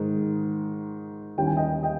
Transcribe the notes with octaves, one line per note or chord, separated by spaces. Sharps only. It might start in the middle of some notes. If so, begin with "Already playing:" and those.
Already playing: G#2 D#3 G#3 D#4
D#2 D#3 G3 C#4 E4 G5
G#5
D#5 G5
D#5 G5